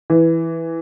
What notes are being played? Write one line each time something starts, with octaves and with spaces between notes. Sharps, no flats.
E3